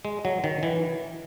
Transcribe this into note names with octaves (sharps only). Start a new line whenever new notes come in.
G#3
F#3
D#3
E3